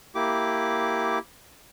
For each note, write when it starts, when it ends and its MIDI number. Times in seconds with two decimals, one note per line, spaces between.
0.15 1.19 58
0.15 1.19 64
0.15 1.19 67
0.15 1.19 86